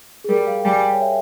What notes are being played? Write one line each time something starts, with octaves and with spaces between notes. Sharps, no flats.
G#4
G3 A#4
F5
G5
G3 G#5
G5
C#5
E5